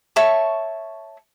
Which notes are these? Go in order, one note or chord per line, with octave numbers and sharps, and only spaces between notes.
C#5 E5 A5 C#6